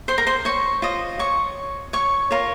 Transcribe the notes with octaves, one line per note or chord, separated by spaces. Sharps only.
C5 C6
A#4 A#5
C5 C6
C#5 C#6
F4 C5 D#5
C#5 C#6
C#5 C#6
F4 A#4 C#5